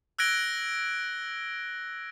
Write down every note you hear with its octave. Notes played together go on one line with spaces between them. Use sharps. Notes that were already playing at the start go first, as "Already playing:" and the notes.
E6 F#6 G#6 A#6 D7 G7